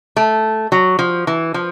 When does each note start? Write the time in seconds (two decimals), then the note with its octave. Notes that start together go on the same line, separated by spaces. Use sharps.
0.17 A3
0.72 F#3
0.99 F3
1.27 E3
1.54 F3